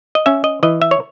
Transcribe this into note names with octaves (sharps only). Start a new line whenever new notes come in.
D#5
C#4 E5
D#5
E3 D#5
E5
C#5